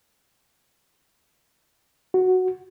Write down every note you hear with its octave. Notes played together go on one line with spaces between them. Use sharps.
F#4